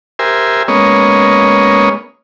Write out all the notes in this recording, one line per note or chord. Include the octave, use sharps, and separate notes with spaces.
G4 A#4 C5 E5 G#5
G#3 A#3 B3 C#4 C#5 D#5